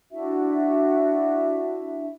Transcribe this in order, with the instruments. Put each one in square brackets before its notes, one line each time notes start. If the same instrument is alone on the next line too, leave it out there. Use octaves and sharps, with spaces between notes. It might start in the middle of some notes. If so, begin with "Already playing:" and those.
[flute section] D4 E4 F#4 E5